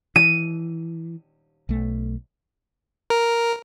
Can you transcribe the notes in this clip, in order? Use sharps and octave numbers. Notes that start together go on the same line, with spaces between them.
E3 D#7
B1 A3
A#4